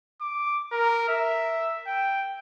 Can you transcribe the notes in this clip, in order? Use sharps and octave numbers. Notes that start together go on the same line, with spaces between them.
D6
A#4
E5
G5